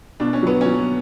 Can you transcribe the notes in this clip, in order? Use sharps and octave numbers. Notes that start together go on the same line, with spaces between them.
B2 D4
C#4
F#3 B3
F#3 C#4